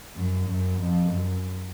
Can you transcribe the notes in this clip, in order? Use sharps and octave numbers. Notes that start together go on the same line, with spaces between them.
F#2
F#2
F2
F#2